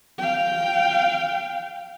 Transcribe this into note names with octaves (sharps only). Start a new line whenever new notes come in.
F5 G5